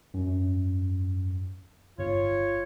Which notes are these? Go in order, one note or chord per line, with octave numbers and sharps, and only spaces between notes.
F#2
G1 F4 C#5